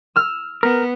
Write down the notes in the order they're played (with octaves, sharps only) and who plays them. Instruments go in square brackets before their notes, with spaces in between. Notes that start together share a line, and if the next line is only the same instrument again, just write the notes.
[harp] E6 F6
[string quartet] B3 [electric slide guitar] A#4